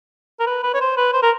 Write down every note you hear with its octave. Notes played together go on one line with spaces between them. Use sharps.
A#4
B4
B4
C#5
C5
B4
C5
A#4